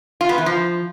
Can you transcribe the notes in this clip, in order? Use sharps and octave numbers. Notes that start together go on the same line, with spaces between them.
F4
B3
E3
F3